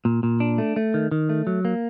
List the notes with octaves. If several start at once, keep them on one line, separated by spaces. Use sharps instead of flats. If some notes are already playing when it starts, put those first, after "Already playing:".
A#2
A#2
D4
A3
A3
D#3
D#3
A3
F#3
A#3